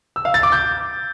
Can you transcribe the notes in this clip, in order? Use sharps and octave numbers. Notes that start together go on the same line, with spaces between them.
E6
F5
A6
D6
G6